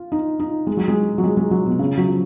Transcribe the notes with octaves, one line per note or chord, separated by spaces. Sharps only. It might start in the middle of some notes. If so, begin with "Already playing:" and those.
Already playing: F4
D#4
D#4
G#3
F#3
G#3
F#3
G#3
G#3
F#3
B2
C#3
F#3
F3